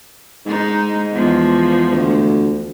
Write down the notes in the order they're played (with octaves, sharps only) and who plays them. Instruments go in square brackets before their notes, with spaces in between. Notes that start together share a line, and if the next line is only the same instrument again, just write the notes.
[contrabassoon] G#2 [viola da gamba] G#3 D#4
[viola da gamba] E2 F3 G#3
[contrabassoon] D2